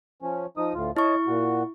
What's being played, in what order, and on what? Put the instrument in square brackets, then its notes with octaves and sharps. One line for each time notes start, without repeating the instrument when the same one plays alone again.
[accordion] F3 C#4
F3 D#4 D#6
D2 A2 F4
[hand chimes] E4 C#6 [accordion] C#5 D#5 A5
[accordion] A#2 F#4